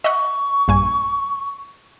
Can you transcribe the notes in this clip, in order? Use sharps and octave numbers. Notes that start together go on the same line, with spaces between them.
D#5 E5 F#5 C#6
A#1 G2 G#5